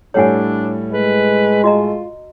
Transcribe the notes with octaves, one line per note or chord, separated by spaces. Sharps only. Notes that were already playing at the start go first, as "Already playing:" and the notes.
A2 G3 D4 A4 C#5 F#5 G#5
G#3 B4
F4 F#4 D#5 A#5